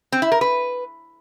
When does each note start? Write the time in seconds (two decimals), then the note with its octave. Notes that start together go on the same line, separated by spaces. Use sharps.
0.12 C4
0.22 E4
0.32 A#4
0.41 B4